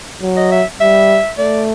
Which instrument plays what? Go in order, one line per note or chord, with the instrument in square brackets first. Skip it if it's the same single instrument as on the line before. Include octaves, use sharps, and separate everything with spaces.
[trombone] F#3
[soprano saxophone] D#5
E5
[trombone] G3 [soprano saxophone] E5
[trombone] A3 [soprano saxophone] D5